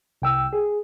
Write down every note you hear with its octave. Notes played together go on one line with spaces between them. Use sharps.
C2 G5 E6
G#4